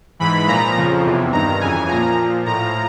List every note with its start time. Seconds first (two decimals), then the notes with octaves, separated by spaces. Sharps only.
0.20 G#2 E3 B5
0.48 A#2 F3 A#5
0.76 F2 C#3 F3
1.05 E2 C3 E3
1.33 G2 D#3 A#5
1.60 F2 C#3 E3 G#5
1.88 A#2 F3 A#5
2.16 A#2 F3
2.45 A2 F3 A#5